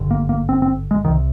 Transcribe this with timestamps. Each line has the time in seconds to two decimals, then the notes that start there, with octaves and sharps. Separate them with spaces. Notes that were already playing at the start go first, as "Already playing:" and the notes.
Already playing: G#1 G2 D3
0.11 A#3
0.29 A#3
0.49 C4
0.62 C4
0.91 G#3
1.05 C2 C3 D#3